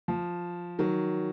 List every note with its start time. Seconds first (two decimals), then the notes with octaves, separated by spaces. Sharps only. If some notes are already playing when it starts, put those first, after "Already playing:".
0.08 F3
0.79 D#3 F#3